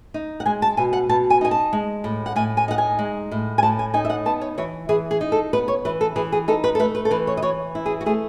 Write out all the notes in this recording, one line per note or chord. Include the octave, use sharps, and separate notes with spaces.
D#4
F#5
G#3 G#5
A5
B2 G#5
F#5
B2 A5
G#5
D#4 G#5
A5
G#3
A2
F#5
A2 G#5
G#5
D#4 F#5
G#5
G#3
A2
G#5
A2 A5
G#5
D#4 G#5
E5
F#5
B3 A5
C#5
E3 C#5
E3 G#4
G#4
D#4
A4
B3 B4
C#5
E3 B4
A4
E3 G#4
G#4
D#4 A4
B4
A4
A3 B4
B4
A4
E3 B4
C#5
D#5
E3 C#5
E4
G#4
F#4
A3 G#4